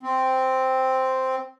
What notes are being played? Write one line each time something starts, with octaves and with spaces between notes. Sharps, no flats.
C4